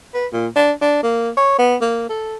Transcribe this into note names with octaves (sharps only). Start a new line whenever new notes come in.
B4
A#2
D4
D4
A#3
C#5
B3
A#3
A4